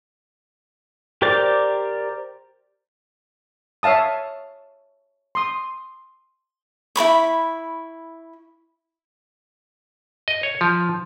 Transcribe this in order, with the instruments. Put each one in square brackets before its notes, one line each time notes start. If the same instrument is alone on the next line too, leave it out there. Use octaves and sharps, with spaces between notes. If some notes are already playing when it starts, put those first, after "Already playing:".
[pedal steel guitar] G4 A#4 C5 D5 D6
[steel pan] C#5 E5 F5 A5 D#6
C6 D#6
[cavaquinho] E4 A#4 B5 C#6
[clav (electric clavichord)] D#5
C#5
F3